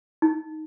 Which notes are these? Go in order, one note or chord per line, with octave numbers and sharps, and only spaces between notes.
D#4